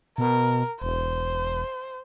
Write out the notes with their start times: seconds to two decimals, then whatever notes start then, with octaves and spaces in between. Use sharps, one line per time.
0.18 B2 A#4
0.82 E1 C5